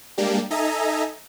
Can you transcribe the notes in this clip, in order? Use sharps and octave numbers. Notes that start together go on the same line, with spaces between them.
G3 G#3 A#3 D4 G4
D#4 A4 D#5 E5 G#5 A#5